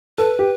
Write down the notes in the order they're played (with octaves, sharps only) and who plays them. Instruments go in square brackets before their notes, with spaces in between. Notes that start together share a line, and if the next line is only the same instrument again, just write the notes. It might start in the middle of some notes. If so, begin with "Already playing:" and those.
[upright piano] A4 [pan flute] B4
[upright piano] G4